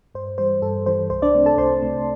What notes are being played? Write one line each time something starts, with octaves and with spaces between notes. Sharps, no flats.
G2 C5
E3 G3 C5
G2 A4
E3 G3 C5
C2 C5
D4 D5
C3 A3 C4
A4 A5
C2 C5 C6
C3 A3 C4